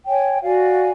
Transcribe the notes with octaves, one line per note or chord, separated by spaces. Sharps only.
C#5 G5 G#5
F#4 D5 F5 G#5